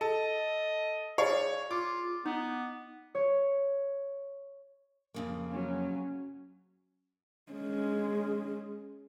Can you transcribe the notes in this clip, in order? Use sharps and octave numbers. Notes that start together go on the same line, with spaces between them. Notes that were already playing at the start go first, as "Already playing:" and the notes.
A4 D#5
G#4 C#5 D5 F5
F4 D6
B3 D#4
C#5
F2 C#3 A#3
F#3 C#4
G#3 C#4